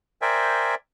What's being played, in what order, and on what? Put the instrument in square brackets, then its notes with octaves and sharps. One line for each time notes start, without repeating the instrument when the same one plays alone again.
[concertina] A#4 C5 D5 E5 G5 G#5